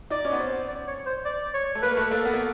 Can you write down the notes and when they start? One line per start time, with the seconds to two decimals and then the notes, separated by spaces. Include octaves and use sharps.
0.10 D#4 D5
0.25 C#4
0.32 B3
0.40 C4
0.68 D5
0.88 C#5
1.06 C5
1.25 D5
1.54 C#5
1.75 A3
1.83 A#3 B4
1.97 A3
2.11 A#3 A4
2.25 B3
2.34 A#3